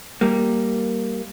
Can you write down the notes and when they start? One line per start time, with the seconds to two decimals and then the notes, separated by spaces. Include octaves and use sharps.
0.21 G3 A#3